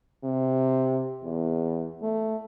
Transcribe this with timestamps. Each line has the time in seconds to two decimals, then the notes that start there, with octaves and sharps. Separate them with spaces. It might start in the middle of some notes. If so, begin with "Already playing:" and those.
0.23 C3
1.23 E2
2.02 A3